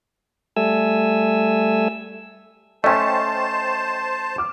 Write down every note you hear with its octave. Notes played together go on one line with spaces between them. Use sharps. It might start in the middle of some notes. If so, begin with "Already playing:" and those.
G3 A3 A4 E5 G#5 E6
A3 C#4 C5 D#5 G5 A5 C#6
D6 F6